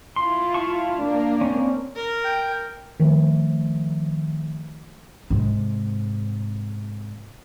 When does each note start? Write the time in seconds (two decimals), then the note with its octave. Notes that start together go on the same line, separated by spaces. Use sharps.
0.16 E4 F4 C6
0.54 F5 A5 C#6
0.98 A#3 D4
1.41 C4 C#4
1.95 A#4
2.24 G5
3.00 D#3 F3 A3
5.30 G#2 C3